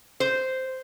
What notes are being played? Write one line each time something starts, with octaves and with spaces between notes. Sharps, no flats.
C5